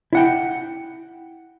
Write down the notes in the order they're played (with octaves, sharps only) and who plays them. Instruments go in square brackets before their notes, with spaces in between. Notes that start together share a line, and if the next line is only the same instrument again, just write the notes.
[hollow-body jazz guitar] E4 F#5 G5